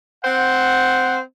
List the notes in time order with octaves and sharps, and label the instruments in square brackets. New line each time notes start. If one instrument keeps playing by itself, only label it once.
[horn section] C4 C5 F#5